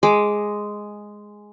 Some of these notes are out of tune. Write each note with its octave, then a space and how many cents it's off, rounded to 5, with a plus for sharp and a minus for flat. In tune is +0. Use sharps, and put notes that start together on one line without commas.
G#3 +0 D6 +0